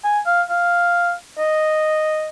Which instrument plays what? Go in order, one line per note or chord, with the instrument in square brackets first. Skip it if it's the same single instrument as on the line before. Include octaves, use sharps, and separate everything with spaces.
[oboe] G#5
F5
F5
D#5